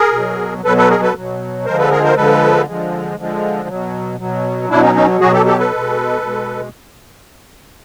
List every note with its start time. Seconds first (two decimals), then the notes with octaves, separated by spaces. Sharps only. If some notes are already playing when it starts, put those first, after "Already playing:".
Already playing: G#4 A#4
0.13 B2 F#3
0.64 B2 F#3 A4 B4
0.77 A4 B4
0.90 G#4 A#4
1.02 A4 B4
1.15 B2 F#3
1.65 D3 F3 G#3 A#4 C5
1.78 A4 B4
1.91 G#4 A#4
2.04 A#4 C5
2.16 D3 F3 G#3 A4 B4
2.67 D3 F3 G#3
3.18 D3 F3 G#3
3.68 B2 F#3
4.19 B2 F#3
4.70 B2 F#3 D4 E4
4.82 C#4 D#4
4.95 C#4 D#4
5.20 B2 F#3 F#4 G#4
5.33 G4 A4
5.46 G4 A4
5.58 A4 B4
5.71 B2 G#3
6.22 B2 G#3